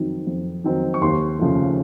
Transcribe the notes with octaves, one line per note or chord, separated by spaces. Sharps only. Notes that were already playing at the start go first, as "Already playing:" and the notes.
Already playing: F2 D#3 F#3 C4 D#4
F2
D#3 F#3 C4 D#4
C#6
D#2 C6
C#3 F3 A3